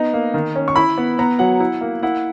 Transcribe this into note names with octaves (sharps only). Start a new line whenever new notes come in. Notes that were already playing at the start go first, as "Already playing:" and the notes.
Already playing: B3 D#4
A#3
D#3
C#4
C#6
E4 B5
B3
B3 A#5
F#3 F#5
E4
A#3
E4 F#5